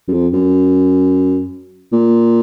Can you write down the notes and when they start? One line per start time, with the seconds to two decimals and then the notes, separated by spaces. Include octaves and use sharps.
0.08 F#2
0.13 F2
0.33 F#2
1.92 A#2